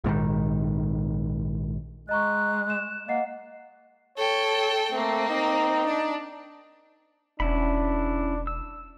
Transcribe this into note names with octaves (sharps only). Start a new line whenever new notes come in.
A#1 G#2 B2 D#3
G#3 D#5 A#5 C#6 F#6
E7
A#3 D#5 F#5 C7
A4 C#5 G5
A3 A#3 C4
D#4
D4
E1 C#4 D4 E4 B5
E6